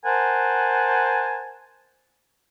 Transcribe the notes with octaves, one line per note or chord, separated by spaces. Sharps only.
A#4 C5 F#5 G#5 A5